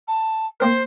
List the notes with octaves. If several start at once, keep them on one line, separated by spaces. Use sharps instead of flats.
A5
A#3 C4 A#4 C5